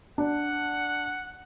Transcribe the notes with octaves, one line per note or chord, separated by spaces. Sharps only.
D4 F#5